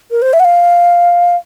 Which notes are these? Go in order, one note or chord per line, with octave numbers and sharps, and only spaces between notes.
A#4
C5
E5
F#5
F5